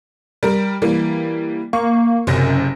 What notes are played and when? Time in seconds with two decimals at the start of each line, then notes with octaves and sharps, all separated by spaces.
0.43 G3 A#4
0.82 E3 G3 A#3
1.73 A#3 C#6
2.27 F#1 F#2 C3 A#6